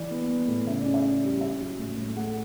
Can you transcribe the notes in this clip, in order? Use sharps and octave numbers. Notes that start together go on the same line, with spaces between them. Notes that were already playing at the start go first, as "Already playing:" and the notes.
Already playing: E3 D5
B3
B3
A2
C#3 E5
D5
C#4
E5
C#4
G3
C#4 E5
F#3
A2
A2
A3 F#5